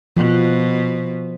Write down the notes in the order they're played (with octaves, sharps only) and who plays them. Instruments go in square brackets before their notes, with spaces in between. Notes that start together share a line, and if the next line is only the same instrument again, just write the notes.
[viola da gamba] B2 [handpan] F3